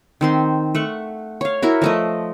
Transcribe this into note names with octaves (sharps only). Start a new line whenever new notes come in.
D#3 C4 C6
A3 F#5 C#6
C#5 F5
E4 F#4 A#4
F3 A3 D#5